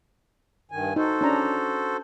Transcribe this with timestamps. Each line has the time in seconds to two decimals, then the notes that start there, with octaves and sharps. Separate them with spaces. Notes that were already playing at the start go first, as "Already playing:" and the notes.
0.71 G2 D#3 G#5
0.96 D#4 F#4 A4 C5
1.21 C#4 D4 A#5